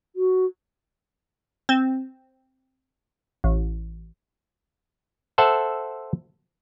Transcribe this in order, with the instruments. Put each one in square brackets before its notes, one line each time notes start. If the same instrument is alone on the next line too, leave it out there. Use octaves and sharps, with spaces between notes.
[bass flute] F#4
[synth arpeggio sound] C4
A1
[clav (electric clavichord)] A4 C5 E5 F#5 A5